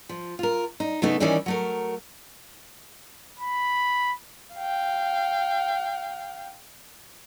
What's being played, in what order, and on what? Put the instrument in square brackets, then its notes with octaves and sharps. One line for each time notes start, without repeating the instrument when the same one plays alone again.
[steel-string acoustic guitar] F3
F4 A#4
D#4
C#3 A3 B3 D#4
D#3 E3 G3 C#4 D#4 D5
F#3 A3 A#4
[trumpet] B5
[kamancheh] F5 G5